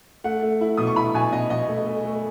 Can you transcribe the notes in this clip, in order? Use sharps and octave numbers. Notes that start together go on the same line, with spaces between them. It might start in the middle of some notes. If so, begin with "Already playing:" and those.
A3 F#5
A3
E4
B2 D#6
C#6
E4 B5
B2 G#5
B2 D#5
B2 D#5
A3
A3
A3